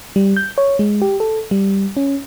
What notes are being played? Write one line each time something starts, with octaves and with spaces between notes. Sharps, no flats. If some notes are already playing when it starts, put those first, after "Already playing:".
G3
G6
C#5
G#3
G4
A4
G3
C#4